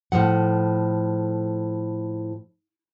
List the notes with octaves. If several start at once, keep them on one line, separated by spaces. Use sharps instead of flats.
A2 F3 F#3 F#5